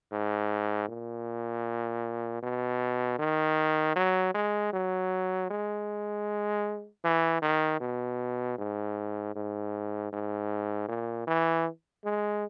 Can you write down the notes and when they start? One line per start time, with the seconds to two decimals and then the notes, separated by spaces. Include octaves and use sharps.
0.12 G#2
0.89 A#2
2.43 B2
3.19 D#3
3.96 F#3
4.34 G#3
4.73 F#3
5.50 G#3
7.05 E3
7.42 D#3
7.80 B2
8.58 G#2
9.35 G#2
10.12 G#2
10.88 A#2
11.27 E3
12.04 G#3